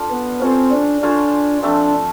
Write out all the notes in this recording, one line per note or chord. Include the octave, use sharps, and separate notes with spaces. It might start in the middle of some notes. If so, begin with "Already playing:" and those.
Already playing: D4 F4 A4
B3
C4 C#4 F4 A4 C5
D4
C#4 D4 F4 A4 C5
F3 A3 C4 D4